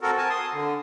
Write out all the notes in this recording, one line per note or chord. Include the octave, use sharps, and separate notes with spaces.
C4 F#4 A4 A#4
G#5 A5
C6 D#6
D3